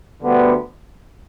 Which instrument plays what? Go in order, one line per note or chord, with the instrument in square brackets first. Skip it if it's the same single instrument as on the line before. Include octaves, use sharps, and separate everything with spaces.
[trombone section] D2 D3 G3 B3